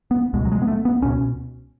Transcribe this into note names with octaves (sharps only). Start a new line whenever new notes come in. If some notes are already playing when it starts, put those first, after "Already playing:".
B3
C#2 B2 G#3
F#3
G#3
B3
A3
B3
C#2 B2 C#4